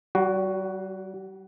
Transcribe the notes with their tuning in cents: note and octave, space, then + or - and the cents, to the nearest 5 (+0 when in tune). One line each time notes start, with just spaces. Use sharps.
G3 -40 F#4 +5